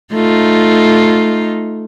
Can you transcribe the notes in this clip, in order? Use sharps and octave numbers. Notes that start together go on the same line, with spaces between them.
A3 D#4 F4